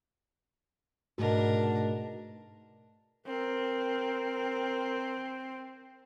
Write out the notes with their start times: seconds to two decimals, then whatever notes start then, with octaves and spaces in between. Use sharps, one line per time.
1.18 G#2 B2 A3 D4 F#4 A#4
3.27 C4 A#4